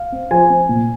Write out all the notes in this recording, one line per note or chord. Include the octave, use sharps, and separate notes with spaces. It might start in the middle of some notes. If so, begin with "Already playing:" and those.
Already playing: F5
C4
F3 G#5
C4
A#2